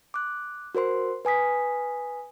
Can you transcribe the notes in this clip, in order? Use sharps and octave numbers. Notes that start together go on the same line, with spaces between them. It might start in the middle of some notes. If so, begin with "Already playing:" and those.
D6 F#6
F#4 A#4 C5 C6
B4 G#5 D#6 B6